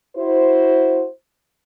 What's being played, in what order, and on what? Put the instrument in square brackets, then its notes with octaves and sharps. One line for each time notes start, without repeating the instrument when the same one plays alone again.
[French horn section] E4 F#4 C5